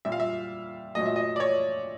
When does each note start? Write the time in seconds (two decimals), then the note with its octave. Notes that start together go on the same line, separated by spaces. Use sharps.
0.05 A#2 G3 E5
0.12 F5
0.20 E5
0.95 A#2 F#3 A3 D#5
1.06 E5
1.16 D#5
1.36 D5
1.40 C#5